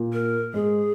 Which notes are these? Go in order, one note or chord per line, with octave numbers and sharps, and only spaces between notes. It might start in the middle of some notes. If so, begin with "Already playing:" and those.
Already playing: A#2 A#3
A#4
G#2 G#3 G#4